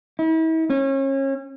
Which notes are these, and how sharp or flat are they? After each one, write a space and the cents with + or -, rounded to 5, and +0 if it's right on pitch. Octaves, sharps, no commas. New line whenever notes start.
E4 -40
C#4 -30